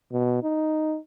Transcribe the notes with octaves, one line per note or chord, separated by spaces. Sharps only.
B2
D#4